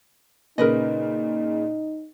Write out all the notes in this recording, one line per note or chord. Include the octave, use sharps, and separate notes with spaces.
A#2 C#3 D#4 A#4 B4 D#5